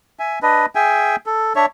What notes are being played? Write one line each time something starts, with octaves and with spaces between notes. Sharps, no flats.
E5 G#5
D4 B4 D#5
G#4 E5 G5 G#5
A4
D4 C#5 E5